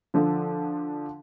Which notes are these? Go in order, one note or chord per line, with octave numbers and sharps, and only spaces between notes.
D3 F3 D4 A4